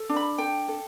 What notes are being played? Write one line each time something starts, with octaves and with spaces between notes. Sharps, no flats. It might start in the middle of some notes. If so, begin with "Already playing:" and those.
Already playing: A4
D4
B5
A4 G5
A4